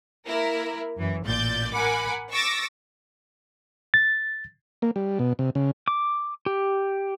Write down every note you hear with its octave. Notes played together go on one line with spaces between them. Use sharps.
A#3 E4 A#4
F#2 E3
A1 A#2 D5 G6 A6
A#4 F#5 G#5 B5 D6
C#6 D6 E6 A6 A#6
A6
A#3
G3
B2
C3
C#3
D6
G4